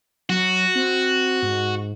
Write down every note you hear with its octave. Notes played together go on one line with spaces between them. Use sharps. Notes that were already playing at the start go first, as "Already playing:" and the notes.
F#3 F#4
C4
G#2